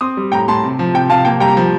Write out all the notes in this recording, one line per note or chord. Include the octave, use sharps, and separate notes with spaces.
C4 C6 D#6
G3
A2 G5 A#5
A2 A5 C6
C3
F3
C3 G5
C3 F5 A5
A#3 G5
G3 G5 A#5
F3